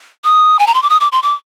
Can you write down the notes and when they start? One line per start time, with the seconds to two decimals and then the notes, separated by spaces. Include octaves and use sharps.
0.24 D#6
0.59 G#5
0.67 A#5
0.74 C6
0.83 D6
0.90 D#6
1.00 D6
1.12 C6
1.23 D6